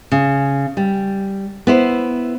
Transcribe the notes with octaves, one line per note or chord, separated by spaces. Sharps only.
C#3
G3
B3 E4 C5